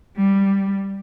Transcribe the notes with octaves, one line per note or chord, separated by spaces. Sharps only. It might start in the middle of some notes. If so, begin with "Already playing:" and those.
G3